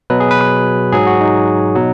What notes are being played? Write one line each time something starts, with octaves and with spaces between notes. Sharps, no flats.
B2 F#3 B4
G#4
B4
B4
G#2 F#3 G#4
F#4
D#4
B2 F#3